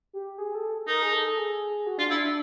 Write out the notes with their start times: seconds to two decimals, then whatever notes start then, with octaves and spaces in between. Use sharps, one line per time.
0.13 G4
0.38 G#4
0.55 A4
0.88 D#4 A#4
1.02 G#4
1.13 A4
1.37 G#4
1.86 F#4
1.98 D4 F4
2.11 D4 E4
2.24 D4